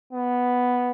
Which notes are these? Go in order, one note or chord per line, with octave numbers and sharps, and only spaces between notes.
B3